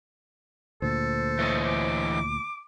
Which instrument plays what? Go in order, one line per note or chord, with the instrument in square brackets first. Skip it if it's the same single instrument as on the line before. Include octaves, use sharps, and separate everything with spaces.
[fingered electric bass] D2 A#2 [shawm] A4 [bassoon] C5
[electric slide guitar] E3 C#5 D#5
[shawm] D6